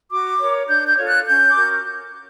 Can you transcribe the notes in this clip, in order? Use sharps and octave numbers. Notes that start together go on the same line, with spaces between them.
F#4 D6
A#4 C#5
D4 G6
G6
F4 A4 C#5
F#6
C#4 G6
D6
F#4 A#4